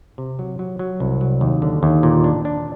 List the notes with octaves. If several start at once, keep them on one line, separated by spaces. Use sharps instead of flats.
C3
F#3
F#3
F#3
C2
F#3
D#2
D3
D#2
A#2
D4
D4